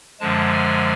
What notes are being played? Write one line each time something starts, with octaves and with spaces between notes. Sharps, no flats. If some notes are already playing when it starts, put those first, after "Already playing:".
F#2 D3 F3 G#3 A5
G#5